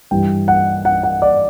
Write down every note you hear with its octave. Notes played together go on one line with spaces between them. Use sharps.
G2 E3 G3 G5
F#5
F#5
F#5
D5